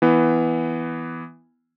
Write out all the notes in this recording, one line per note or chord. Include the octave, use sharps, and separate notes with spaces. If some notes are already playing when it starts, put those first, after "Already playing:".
E3 B3